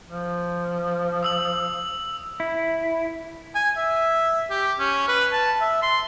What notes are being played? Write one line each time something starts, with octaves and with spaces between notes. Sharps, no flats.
F3
D#6 E6 F#7
E4
G#5
E5
G4
C#4
B4
A5
E5
C6